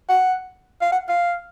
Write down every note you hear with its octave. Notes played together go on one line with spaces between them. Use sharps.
F#5
F5
F#5
F5